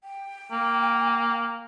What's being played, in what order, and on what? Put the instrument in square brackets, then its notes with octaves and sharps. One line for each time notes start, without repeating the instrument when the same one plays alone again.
[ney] G5
[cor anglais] A#3